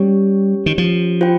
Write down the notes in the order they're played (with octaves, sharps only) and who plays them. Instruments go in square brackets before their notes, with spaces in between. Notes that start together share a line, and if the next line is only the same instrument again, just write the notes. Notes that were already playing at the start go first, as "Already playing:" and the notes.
Already playing: [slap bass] G3 [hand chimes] C#4 G4 C#5
[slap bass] D#3
F3
[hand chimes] F4 C5 G5